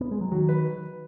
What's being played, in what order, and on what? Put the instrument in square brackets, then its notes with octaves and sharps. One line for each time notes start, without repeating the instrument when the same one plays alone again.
[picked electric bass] B3
G#3
F#3
[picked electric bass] D#3 [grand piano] F#3
[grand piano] B4